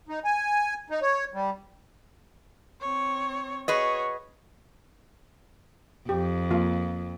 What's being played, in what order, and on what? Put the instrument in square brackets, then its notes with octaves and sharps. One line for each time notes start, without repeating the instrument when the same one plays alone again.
[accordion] D#4
G#5
D#4
C#5
G3
[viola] C4 C#5
[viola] F#4 C#5 [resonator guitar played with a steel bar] G#4 B4 D#5
[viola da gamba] F2 [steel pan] G4
[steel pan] F3 A#3 F4